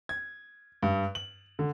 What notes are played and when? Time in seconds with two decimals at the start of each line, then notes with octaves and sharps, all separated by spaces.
0.09 G#6
0.83 G2
1.15 F#7
1.59 D3